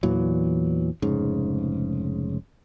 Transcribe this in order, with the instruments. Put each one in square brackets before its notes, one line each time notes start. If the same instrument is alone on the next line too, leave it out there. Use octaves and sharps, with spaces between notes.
[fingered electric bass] E2 A#2 E3 F#3
F1 G#2 C#3